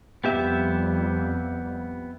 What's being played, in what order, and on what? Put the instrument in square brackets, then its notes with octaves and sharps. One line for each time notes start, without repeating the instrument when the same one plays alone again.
[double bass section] F2 G3 [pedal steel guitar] B3 G4 E5